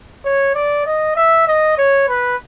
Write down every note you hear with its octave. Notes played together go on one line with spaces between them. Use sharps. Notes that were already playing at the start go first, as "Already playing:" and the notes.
C#5
D5
D#5
E5
D#5
C#5
B4